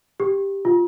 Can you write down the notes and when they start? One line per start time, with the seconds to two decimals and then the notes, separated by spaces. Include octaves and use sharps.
0.20 G4
0.65 F4